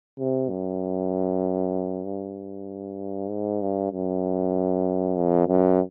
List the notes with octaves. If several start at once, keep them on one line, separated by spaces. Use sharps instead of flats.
C3
F#2
G2
G#2
G2
F#2
F2
F#2